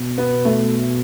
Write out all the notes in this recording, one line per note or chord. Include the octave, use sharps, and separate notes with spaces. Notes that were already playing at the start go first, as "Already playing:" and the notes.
Already playing: B2
B3
A3